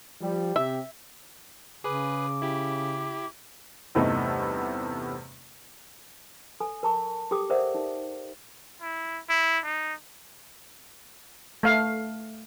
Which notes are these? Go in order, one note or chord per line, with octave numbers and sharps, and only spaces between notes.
F3 G3
C3 G4 E5
C#3 G#4 B4 D6
E4 G4
E2 G2 C3 A3 B3 D#4
A4 G#5
A#4 A5 C#6
G4 A4 G5 D6 D#6
A#4 C5 D5 E5 F#5
D#4
E4
E4
D#4
A3 F5